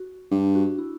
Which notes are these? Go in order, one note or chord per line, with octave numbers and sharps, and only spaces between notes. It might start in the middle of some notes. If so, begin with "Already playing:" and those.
Already playing: F#4
G2 D4
F#4
E4